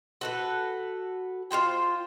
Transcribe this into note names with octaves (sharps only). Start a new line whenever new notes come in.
F#4 A4 B4
F4 F#4 C5 G5